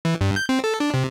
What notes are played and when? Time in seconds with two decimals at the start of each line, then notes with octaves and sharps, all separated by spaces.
0.05 E3
0.21 G2
0.36 G6
0.49 C4
0.64 A4
0.80 D4
0.94 C3